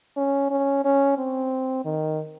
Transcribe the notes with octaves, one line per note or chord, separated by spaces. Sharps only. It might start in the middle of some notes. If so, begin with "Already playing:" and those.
C#4
C#4
C#4
C4
D#3